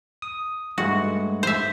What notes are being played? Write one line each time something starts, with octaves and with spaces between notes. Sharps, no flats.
D#6
G2 G#3 A3 F#4
C5 E5